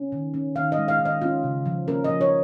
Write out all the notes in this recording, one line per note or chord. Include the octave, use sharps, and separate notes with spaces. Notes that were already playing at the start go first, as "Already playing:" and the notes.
Already playing: C#4
D#3
C#4
D#3 F5
D#5
G#3
F5
D#3
D#5
C#4 F4
C#3
F3
C#4 A#4
D#5
F3
C#5